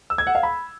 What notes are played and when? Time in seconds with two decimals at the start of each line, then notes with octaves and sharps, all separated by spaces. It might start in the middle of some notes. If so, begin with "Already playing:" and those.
0.10 E6
0.18 G#6
0.27 F#5
0.35 F5
0.43 B5